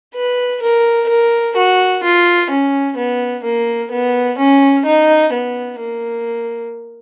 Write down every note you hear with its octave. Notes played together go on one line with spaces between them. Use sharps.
B4
A#4
A#4
F#4
F4
C#4
B3
A#3
B3
C#4
D#4
B3
A#3